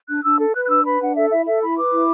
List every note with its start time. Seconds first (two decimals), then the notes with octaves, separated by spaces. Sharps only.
0.09 D4 F#6
0.24 D4 E6
0.39 A4
0.55 B4 F#6
0.65 F#6
0.70 D4 E6
0.85 B4 B5
1.01 D4 F#5
1.16 A4 E5
1.32 E4 E5
1.46 A4 E5
1.62 E4 B5
1.77 B4 D6
1.92 E4